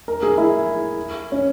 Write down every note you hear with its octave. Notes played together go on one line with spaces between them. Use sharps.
A#4
G#4
E4
C#4